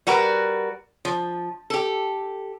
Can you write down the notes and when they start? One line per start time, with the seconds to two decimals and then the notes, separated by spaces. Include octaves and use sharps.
0.07 G3 F#4 A#4 B4
1.05 F3
1.70 G4 A4